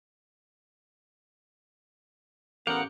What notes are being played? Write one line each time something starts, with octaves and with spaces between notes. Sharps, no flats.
A1 B3 A#4 F5 F#5 D6 G6 C#7